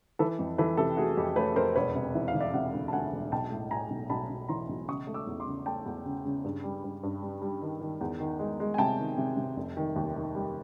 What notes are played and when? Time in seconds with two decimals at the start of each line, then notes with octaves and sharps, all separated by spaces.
0.19 E3 A4 B4
0.39 F2
0.58 E3 A4 B4
0.77 C3 G4 A4
0.97 A3 F#4 G#4
1.17 F2 G4
1.36 A3 B4 C#5
1.56 F2 A#4 C5
1.76 E1 B4 C#5
1.95 C3
2.15 E3 E5
2.28 F5
2.34 E3
2.40 D5 E5
2.53 C3 E5 F#5
2.73 D2
2.88 A5
2.92 D2 F#5 G#5
3.12 E1
3.32 B1 G5 A5
3.52 A2
3.71 A2 G#5 A#5
3.90 B1
4.10 B1 A5 B5
4.29 B1
4.49 E3 A#5 C6
4.69 B1
4.88 C#3 C#6 D#6
5.07 A3
5.14 D6 E6
5.27 E2
5.40 C6 D6
5.47 C#3
5.66 A3 G5 A5
5.86 E2
6.06 C#3
6.25 C#3
6.44 G2
6.64 G3
6.84 G2
7.03 G2
7.22 G3
7.42 G3
7.62 D#3
7.81 D#3
8.01 E2
8.20 D#3
8.39 G#3
8.60 G#3
8.74 G#5
8.78 C3 G5 A5
8.99 D#3
9.18 C3
9.37 C3
9.56 F1
9.77 D#3
9.96 D#2
10.15 D#3
10.35 G3